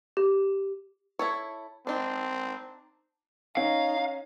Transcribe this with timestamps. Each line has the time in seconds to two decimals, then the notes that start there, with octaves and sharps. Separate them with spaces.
0.17 G4
1.19 E4 A4 C#5
1.87 C4 D4 D#4
3.57 C#4 D#4 F5